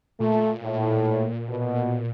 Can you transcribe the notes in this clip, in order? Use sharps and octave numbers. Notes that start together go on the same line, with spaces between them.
A#2 A3
A2
B2